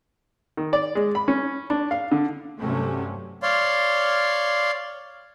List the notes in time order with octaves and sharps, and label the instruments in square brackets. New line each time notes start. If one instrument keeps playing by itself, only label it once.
[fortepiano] D#3
D5
G#3
B5
C#4
D4
F5
D3
[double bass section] G2 C3 F#3 A3 C#4
[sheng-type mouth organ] C#5 D5 F5 C6